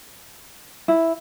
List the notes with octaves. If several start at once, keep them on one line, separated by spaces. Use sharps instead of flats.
E4